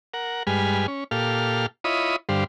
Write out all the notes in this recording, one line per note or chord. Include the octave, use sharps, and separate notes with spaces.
A#4 F#5
G2 G3 G#3 B4 G#5 F6
C#4
A#2 G4 A4 F5 F6
E4 F4 C#5 D#5 B5 D#6
G2 D3 G3 C5 F5